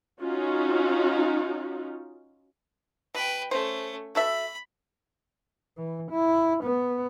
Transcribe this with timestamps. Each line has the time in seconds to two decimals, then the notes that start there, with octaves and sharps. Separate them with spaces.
0.20 C#4 D#4 F4 F#4
3.14 B2 B4 G5
3.51 A3 C#4 C5
4.15 F#4 A4 E5 B5
5.78 E3
6.11 E4
6.64 B3